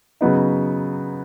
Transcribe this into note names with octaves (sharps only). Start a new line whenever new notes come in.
C#3 F#3 B3 D#4